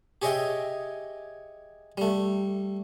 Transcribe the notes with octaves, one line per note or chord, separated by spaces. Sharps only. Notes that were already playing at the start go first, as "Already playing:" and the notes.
G4 G#4 C#5 D#5 E5 G5
G3 A3